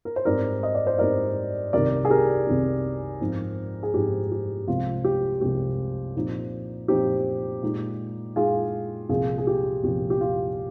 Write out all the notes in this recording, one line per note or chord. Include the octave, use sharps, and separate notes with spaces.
A#4
C5
G#2 G3 C4 D#4 A#4 D5
D#5
D5
C5
G#2 G3 C4 D#4 A#4 D5
C2 C3 D#3 G3 A#4 D5
G#4
G4 A#4
C2 C3 D#3 G3
G#2 F3 C4 D#4
G#4
G#2 F3 C4 D#4 G4
G4
C2 C3 F3 G#3 C4 F4
G4
C2 C3 F3 G#3 C4 G4
A#2 F3 C4 D#4
A#2 F3 C4 D#4 G4
A#2 G#3 D#4
A#2 G#3 D#4 F4 G#4
C2 A#2 F3 F4 G#4
G#4
G4
C2 A#2 F3 G4
G4
F4